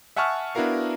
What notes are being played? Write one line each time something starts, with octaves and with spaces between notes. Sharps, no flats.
E5 F#5 G#5 A5 C#6 F6
B3 D4 E4 F#4 A#4 F5